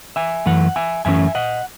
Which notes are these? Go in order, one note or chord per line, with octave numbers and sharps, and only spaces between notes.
E5 G#5
F#2 E3 A3 F#5
E5 G#5
F#2 E3 A3 C#4 E5 G#5
D#5 F#5